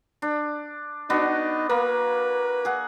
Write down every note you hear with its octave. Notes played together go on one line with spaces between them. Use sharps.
D4
B3 D4 D#4 F#4
A#3 B4
G#4 F#5